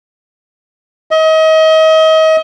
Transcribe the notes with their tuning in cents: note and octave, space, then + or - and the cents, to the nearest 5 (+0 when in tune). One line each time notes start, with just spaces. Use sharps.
D#5 +35